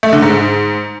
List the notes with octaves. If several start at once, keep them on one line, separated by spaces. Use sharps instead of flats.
A3
D3
G#2